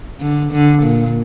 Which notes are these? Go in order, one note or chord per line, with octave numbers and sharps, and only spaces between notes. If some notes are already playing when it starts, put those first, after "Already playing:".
D3
D3
A#2